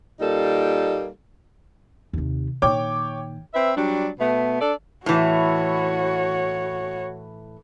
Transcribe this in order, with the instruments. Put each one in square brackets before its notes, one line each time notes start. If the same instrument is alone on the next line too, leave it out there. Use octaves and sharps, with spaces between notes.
[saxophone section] A#2 G3 A#3 D#4 A4
[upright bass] D#2 C3
[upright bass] A#2 D#3 [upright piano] C#5 G5 D6
[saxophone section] C4 B4 E5
F#3 G3 D4
B2 A3 B3
D4 A4 D5
[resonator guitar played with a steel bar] A2 E3 [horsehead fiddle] F#4 C#5